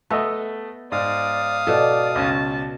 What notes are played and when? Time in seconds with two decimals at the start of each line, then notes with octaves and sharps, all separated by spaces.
0.10 A3 B3 A4 D#5
0.92 G#2 D5 F5 D#6
1.67 B2 A4 D5
2.15 C#2 C#4 A5